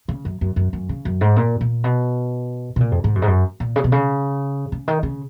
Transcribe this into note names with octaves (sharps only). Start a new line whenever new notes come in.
C#3
F#2
F#2
F#2
F#2
C#3
F#2
G#2
A#2
A#2
B2
B2
A#2
F2
G#2
F#2
G#2
F#2
A#2
C#3
B2
C#3
C#3
D#3
C#3